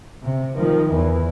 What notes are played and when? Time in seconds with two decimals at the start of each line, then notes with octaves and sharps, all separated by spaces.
0.23 C3
0.56 D#3 F3
0.90 E2 E3